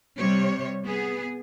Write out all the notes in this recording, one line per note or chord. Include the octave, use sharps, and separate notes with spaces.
C3 G3 C#5
B3 G#4